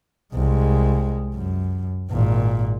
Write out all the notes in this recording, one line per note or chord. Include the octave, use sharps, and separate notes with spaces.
C2 G#3
F#2
G#1 A#2